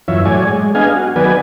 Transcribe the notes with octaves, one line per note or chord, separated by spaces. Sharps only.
F#2 E3 F4 C#5 E5
A2 F#3 C#5 D5 G#5
G#3
B3 D4 G#4 D#5 F5 G#5
F#4
D#3 F#3 B3 B4 D5 G#5